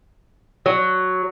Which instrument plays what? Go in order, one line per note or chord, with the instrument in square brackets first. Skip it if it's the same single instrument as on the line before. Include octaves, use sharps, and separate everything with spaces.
[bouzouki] F#3